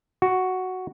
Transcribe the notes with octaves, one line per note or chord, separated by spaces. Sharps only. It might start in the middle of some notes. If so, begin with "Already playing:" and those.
F#4